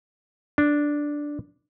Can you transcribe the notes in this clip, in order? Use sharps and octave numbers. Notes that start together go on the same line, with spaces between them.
D4